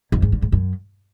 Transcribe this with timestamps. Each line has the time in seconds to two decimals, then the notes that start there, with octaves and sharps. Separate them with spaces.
0.12 F2
0.22 G#2
0.32 D3
0.42 G#2
0.52 F#2